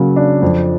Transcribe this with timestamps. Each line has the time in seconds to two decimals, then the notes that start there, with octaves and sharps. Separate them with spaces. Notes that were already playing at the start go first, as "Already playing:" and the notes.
Already playing: C#3 F#3 A#3
0.16 D4
0.42 F2